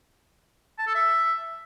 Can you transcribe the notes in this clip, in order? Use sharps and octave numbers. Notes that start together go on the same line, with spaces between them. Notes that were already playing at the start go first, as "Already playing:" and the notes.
A5
A4
E5